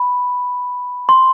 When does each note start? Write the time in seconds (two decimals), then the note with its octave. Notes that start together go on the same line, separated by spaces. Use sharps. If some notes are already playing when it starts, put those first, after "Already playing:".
Already playing: B5
1.09 C6